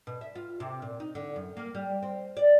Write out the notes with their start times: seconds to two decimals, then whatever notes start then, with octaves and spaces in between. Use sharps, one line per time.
0.07 B2
0.21 E5
0.35 F4
0.60 C3
0.82 A#2
1.00 D#4
1.15 D3
1.36 F#2
1.57 A#3
1.75 G3
2.03 C4
2.37 D5